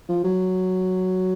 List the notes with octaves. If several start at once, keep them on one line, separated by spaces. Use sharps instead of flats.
F3
F#3